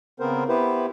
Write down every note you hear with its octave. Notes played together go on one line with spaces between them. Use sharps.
C#3 B3 C4 A#4 C5
B3 E4 G4 B4 C5